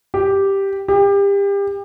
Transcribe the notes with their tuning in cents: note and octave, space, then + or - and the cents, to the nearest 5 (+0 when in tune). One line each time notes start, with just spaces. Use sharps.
G4 +0
G4 +30